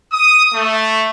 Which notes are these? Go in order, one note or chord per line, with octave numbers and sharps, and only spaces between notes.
D#6
A3